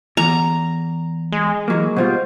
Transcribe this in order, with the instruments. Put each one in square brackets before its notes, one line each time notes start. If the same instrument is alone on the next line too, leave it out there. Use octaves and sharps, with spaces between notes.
[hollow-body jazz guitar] E2 [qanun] A#5
[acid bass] G#3
[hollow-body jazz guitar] E3 F#3 A#3
[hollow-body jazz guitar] B2 G3 F4 [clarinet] C5